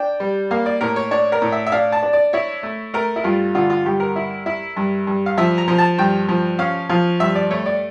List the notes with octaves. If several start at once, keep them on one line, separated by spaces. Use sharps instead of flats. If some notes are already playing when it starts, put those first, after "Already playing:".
Already playing: D4 G5
G3
A#3 F5
D5
A2 A#4
C#5
D4 C#5
A#4
A2
E5
E5
D4 F5
A5
D4
D5
E4 C#5
A3
A3 A#4
E4
G2 F4
D3 F4
F4
G2 G4
A#4
E4
E4
G2
G2
F5
F3 E5
A#5
F3
A5
G2 G5
F3
C#4 F5
F3 F5
G2 E5
D5
A3 C#5
D5